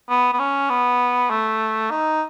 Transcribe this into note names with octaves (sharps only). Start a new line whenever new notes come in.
B3
B3
C#4
B3
A3
D#4